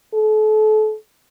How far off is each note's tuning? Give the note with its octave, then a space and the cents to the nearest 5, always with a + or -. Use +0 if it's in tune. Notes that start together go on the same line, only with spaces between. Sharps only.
A4 -35